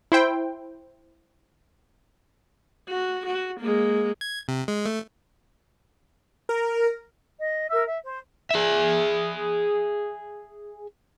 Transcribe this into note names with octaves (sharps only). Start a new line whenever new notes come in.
E4 C5 G5
F#4
F#4
G#3 A#3
G#6
C3
G#3
A3
A#4
D#5
A#4 E5 E6
E5
C5
G#4 E5